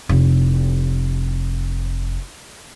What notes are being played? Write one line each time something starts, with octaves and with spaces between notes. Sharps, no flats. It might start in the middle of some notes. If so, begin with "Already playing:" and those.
F1 E4